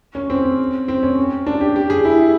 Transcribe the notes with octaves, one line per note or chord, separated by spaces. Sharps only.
C#4
C4
C4
C#4
D4
G4
G4
G#4
E4